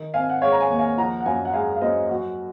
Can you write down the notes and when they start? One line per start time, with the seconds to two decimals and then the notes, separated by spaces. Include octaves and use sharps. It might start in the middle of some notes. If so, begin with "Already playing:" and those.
Already playing: D#3
0.14 C4 F5 G#5
0.29 F#5
0.42 G#3 C#5 F5
0.52 A#5
0.60 F5 G#5
0.70 D#2
0.79 F5 G#5
0.98 F3 F#5 A#5
1.20 F#5
1.25 F#2 F5 G#5
1.45 F#5
1.54 G#3 F5 G#5
1.76 F5
1.82 F#2 C5 D#5
2.10 F#3 F#4